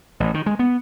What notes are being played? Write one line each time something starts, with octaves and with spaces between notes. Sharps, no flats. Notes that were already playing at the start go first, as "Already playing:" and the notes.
A1
D#3
G#3
B3